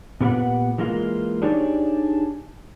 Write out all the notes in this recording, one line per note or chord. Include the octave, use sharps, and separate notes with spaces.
A#2 B3 G4 A#4 B4 F#5
E3 G#3 A#3 F4
D4 D#4 G4 G#4 C#5 D5